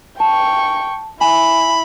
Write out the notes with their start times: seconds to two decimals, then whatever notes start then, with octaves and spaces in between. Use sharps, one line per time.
0.20 G5 A5 C#6
1.21 E4 G#5 B5